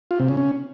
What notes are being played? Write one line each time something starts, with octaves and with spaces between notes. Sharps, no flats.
F4
C3
C#3
C#4